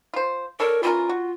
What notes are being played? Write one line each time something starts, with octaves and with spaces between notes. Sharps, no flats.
F4 C5
D4 A4 A#4 C#5
E3 C#4 F4 A#4
F#4